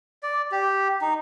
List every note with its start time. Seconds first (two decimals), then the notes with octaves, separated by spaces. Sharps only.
0.23 D5
0.52 G4
1.01 D#4